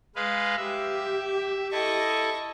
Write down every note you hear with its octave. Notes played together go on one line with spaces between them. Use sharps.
G#3 B4 F5
G4 E5
E4 A4 D#5 C#6